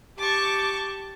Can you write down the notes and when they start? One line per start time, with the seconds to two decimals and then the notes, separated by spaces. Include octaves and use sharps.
0.18 G4 A5 C#6 D6